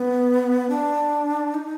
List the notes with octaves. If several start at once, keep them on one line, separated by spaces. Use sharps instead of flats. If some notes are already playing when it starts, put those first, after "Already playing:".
Already playing: B3
D4
D#4